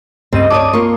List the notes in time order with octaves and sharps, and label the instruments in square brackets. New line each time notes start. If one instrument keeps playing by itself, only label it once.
[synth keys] C#2 G2 D#5 [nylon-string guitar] C4
[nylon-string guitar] C#5 D5 A5 [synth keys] D6 D#6 D#7
[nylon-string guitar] A#3 F4 [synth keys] C#6